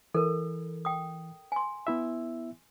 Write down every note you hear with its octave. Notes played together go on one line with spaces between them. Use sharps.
E3 A4 A#4
G5 D#6
G#5 C6
B3 E4 E5